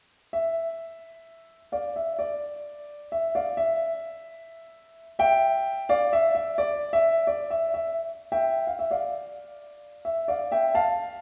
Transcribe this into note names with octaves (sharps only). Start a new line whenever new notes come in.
E5
D5 F5
E5
D5
E5
D5 F5
E5
E5 G5
D5 F5
E5
E5
D5
E5
D5
E5
E5
E5 G5
F5
E5
D5 F5
E5
D5 F5
E5 G5
F5 A5